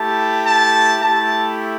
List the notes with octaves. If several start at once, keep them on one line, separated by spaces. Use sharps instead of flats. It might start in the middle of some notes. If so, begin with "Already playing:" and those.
Already playing: A3 E4 G4 A5
A5
A3 E4 G4 A5